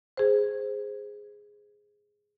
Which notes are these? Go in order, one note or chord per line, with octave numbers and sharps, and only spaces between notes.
G#4 C5